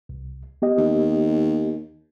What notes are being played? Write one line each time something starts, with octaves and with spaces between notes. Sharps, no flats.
C2
B3 G4 D#5
D#2